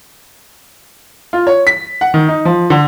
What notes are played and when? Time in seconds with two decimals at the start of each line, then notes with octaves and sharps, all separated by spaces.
1.33 F4
1.47 C#5
1.67 B6
2.01 F#5
2.14 D#3
2.29 D#4
2.45 F3
2.70 D3